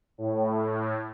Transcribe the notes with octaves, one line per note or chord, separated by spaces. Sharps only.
A2